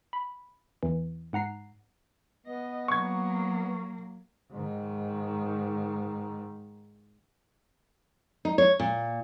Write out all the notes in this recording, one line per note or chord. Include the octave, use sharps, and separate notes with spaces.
B5
E2 E3
G#2 F#5 A#5 C7
B3 D#5
F#3 A#3 C#6 G#6
G#2 D#3
D#4
C#5
A#2